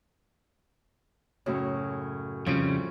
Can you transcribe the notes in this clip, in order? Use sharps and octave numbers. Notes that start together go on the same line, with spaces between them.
F#2 A2 C#3
F2 C#3 F3 G3 C#4 E4